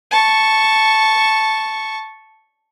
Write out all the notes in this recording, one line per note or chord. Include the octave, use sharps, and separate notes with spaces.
A5 C#6